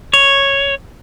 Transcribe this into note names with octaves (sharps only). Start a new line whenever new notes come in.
C#5